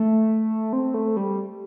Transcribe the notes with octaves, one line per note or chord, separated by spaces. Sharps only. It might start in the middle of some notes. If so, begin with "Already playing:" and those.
Already playing: A3
C4
A3
G3